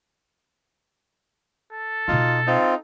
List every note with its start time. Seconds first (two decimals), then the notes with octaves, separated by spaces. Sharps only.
1.73 A4
2.08 B2 G#3 D#4 F4
2.47 C4 D#4 F4